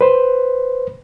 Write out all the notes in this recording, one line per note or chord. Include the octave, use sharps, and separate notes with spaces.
B4 C5